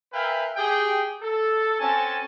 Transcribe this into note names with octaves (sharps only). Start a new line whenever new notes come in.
A#4 B4 E5 F5 G5 G#5
G4 G#4 G5
A4
C4 C#4 F#4 A4 G#5 A5